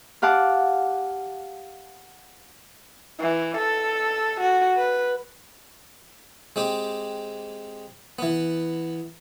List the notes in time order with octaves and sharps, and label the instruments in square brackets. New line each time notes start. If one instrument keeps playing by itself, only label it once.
[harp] G4 F5 F#5 A5 D6
[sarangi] E3
A4
F#4
B4
[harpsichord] G#3 C4 G4
E3 B3